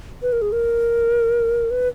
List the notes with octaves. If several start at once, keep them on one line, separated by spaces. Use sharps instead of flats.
B4
A#4
G#4
A#4
B4